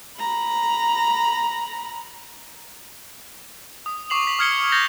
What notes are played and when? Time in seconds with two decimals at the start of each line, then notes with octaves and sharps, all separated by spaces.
0.19 A#5 B5
3.86 D#6
4.10 C#6 D6 C7 F7 F#7
4.25 C#6 B6 F#7
4.39 D#6 F6 G#6 C#7 G7
4.72 G6 A6 A#6 F7 G7